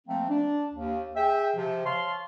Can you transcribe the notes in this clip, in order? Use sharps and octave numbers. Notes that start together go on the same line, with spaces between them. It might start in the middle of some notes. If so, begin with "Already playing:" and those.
F3 A3 A#3 C4
D4
D#2
G#4 E5 G5
C3 F3
C#5 F5 A5 C6